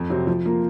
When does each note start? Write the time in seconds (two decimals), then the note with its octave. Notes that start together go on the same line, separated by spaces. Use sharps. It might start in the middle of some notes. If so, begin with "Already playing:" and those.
Already playing: F2
0.10 C3 F#3 C4
0.27 F3
0.45 A#3 F4 A#4